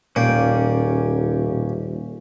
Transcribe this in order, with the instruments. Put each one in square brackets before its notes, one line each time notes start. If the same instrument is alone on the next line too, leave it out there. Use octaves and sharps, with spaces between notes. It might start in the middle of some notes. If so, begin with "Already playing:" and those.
[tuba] D#1 [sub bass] A#2 [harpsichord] A#3 [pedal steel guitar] C#4 D5 G5